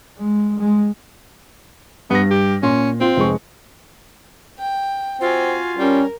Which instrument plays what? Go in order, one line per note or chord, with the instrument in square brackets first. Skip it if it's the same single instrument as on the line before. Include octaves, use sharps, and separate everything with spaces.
[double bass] G#3
G#3
[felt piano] G2 A#6 [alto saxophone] B3
[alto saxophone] G4
[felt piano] A#2 C6 [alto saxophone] C#4
[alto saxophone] C4 [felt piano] F4
[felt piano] F1 G#3 C#6
[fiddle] G5
[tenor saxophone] C4 [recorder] F4 [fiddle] F#4 G#5
[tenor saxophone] G3 [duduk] C#4 [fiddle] A#4